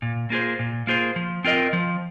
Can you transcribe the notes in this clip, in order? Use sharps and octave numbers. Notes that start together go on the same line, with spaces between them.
A#2
A#3 F4 G#4 C5
A#2
A#3 F4 G#4 C5
F3
C4 F4 A#4 D#5
F3